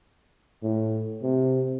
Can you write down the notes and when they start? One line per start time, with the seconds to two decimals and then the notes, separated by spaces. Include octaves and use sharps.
0.63 A2
1.23 C3